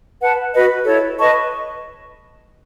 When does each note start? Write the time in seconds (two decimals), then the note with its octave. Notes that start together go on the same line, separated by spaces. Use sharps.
0.20 B4 F#5 A5
0.53 F#4 B4 D#5
0.86 E4 A4 C#5
1.19 B4 D#5 A5 C#6